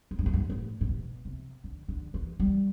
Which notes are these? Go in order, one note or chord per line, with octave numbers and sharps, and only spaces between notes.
A2
G2
F#2
G2
A2
A2
B2
C3
D3
D3
E3
G3